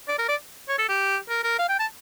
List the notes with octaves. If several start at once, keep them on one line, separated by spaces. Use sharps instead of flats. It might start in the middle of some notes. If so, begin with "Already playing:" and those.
D5
A#4
D5
C#5
A4
G4
A#4
A#4
F5
G5
A5